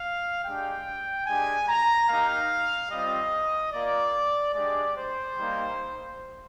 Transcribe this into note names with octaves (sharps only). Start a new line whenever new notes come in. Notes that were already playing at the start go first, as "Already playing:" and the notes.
Already playing: F5
G#3 D4 G4 G5
G#3 D4 G4 G#5
A#5
A#3 D#4 G4 F5
G3 C4 F4 D#5
A#3 F4 D5
G#3 D4 G4 D5
C5
G3 A#3 D#4